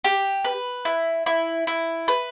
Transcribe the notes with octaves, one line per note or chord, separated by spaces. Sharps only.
G4
B4
E4
E4
E4
B4